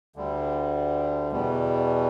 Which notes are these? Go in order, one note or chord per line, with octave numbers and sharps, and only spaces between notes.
D2 D3 G3
E2 B2 G3